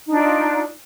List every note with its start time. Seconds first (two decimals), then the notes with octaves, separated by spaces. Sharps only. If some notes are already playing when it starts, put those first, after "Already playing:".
0.06 D#4
0.11 D4
0.16 F4